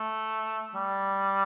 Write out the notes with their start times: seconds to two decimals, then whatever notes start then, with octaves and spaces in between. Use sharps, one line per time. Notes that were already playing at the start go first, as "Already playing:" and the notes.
Already playing: A3
0.75 G3